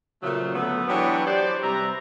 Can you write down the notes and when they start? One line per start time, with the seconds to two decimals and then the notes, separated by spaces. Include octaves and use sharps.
0.22 A#2 C#3 F3 F#3 A3
0.54 D3 F#3 A3 B3
0.88 E3 F#3 B3 D4 G4 C#5
1.26 G4 C5 D5
1.62 C3 G3 B4 E5 A#5